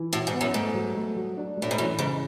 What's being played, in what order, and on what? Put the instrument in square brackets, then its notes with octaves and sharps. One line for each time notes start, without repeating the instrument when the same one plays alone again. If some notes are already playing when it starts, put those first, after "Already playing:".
Already playing: [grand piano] E3
[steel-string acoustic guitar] A2 [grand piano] F#4
[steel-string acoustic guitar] G#2
[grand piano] B3
[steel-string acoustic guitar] F#2
[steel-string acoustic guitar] G#2 [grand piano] A3
[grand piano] F#3
A3
F#3
D4
[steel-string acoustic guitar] A2 [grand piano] A3
[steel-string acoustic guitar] G#2
[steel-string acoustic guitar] F#2 [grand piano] E3
[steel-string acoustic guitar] G#2 [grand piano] C#3